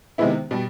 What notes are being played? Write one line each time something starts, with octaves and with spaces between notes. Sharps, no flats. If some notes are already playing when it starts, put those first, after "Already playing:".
C3 D#3 G#3 B3 E4
B2 G3